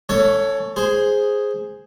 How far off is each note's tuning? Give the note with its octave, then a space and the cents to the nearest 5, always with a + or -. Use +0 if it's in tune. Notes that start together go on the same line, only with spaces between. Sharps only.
C#4 +45 A4 +20 C#5 +0
G#4 +0 C5 +0